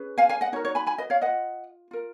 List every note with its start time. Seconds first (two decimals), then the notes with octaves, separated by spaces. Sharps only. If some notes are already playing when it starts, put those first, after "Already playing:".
Already playing: C#4 G#4 B4
0.18 F5 G#5
0.29 F5 G#5
0.41 D#5 F#5
0.52 D#4 F#4 A#4 C#5
0.65 C#5
0.75 G#5 B5
0.87 G#5 B5
0.98 B4 D#5
1.10 C#5 F5
1.21 F4 B4 D#5 F#5
1.91 F4 A#4